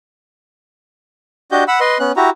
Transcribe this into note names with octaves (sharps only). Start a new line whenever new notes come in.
D4 F#4 G4 D#5 G6
F#5 B5 E6
B4 D#5 C6
B3 C#4 F#6
E4 F#4 G4 A#5